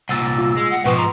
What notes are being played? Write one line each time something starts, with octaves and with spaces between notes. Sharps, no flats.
C2 A#2 F#5 E6 A6
F4
G#3
F#5
G#2 B2 F3 B4 G5 C#6
A#5 C6